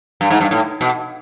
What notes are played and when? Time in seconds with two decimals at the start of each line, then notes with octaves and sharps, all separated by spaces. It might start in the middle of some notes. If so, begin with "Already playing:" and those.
0.21 G2
0.30 G#2
0.41 G2
0.51 A2
0.81 B2